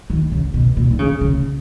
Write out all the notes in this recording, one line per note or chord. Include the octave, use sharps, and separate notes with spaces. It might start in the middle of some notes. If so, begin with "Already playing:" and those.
D#3
C#3
B2
A#2
D#3
C#3
C#3